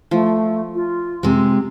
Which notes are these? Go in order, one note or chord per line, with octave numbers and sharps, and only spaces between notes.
F3 A3
F4
C3 G#3